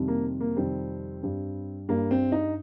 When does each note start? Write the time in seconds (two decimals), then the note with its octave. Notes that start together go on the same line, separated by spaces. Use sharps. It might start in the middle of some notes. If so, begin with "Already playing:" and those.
Already playing: F2 C3 D#3 G3
0.08 A#3
0.41 A#3
0.56 F2 C3 D#3 G3 C4
1.23 G2 G3
1.88 G2 G3 A#3
2.11 C4
2.32 D#4